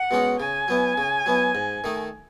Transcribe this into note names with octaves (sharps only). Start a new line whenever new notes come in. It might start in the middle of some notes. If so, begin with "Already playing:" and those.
Already playing: F#5
B2 G#3 C#4 F#4
C#3 G#5
F#3 B3 E4
C#3
F#3 B3 E4
G#2
D#3 A3 D#4